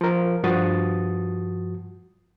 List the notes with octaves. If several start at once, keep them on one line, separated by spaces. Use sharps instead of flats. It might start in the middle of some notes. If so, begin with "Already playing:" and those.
F3 A#4
G2 F3 F#4 D#6 A6